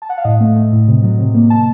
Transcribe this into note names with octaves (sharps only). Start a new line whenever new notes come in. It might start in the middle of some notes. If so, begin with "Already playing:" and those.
A5
F#5
F5
A2 D#5
A3
A3
A2
C3
F#3
C3
A#3
A5